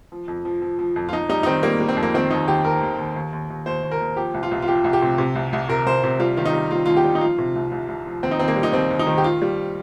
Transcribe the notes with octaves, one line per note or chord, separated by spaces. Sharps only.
F3
F2
F3
F3
F3
F2
F4
F2 D#4
G3 D#4
D#4
D#3 C4
G3 A#3
G3
C4
F2
A#3
D#3 C4
D#2 D#4
D#2 G4
D#2 A#4
D#2
D#2
D#2
D#2
D#2
D#2 C5
D#2
A#4
D#2
F3 G4
C2
F4
C2
F4
F3 G4
C2
G4
C3
C3
C2
C2
C3 A#4
C2 C5
C3
G3 F4
D#3 F4
D#4
G3
G3 F4
D#2 F4
G4
G3
D#4
F3 F4
C3
C2
C2
C2
F3
D#2 C4
D#4
D#2 C4
A#3
G3
D#4
D#2 C4
D#2
D#4
D#3
G4
D#3 F4
G3